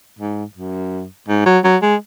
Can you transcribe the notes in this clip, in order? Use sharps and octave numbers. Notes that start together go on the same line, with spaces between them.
G#2
F#2
G#2
F#3
F#3
G#3